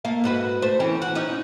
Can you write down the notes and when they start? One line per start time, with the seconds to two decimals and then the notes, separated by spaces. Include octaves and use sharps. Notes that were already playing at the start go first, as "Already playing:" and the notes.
0.05 A3 A#3 F5
0.24 G#2 F#4 B4
0.62 A3 C5
0.80 E3 C4 C#4
1.02 F#4
1.15 C#4 D#4